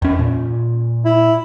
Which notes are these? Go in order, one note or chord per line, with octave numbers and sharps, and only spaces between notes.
E2 C#4
A#2
E4